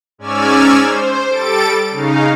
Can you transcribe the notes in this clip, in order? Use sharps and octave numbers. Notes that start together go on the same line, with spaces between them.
G#2 C#4 D5 G#5 E6 F6
C5
G3 A4 A6 D7
C#3 D#4 F5